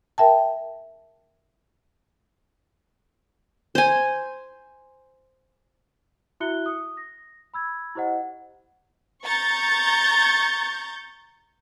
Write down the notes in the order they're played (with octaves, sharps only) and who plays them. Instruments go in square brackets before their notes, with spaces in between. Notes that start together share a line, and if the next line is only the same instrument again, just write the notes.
[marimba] A#4 E5 G5 A5
[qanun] C5 G#5
[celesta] E4 F#4 E5 F#6 C#7 G7
D#6
A#6
B5 E6 G#6
E4 G4 C5 D#5 F#5
[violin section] A#5 C#6 G6 A6